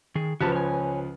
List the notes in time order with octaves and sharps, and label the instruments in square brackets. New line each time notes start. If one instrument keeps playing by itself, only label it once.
[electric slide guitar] D#3 G#4
[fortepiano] C#2 F3 B4 [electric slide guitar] F#4 G4 A5
[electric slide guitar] C#5 G#5